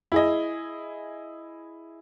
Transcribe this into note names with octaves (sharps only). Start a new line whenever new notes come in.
E4 G#4 D#5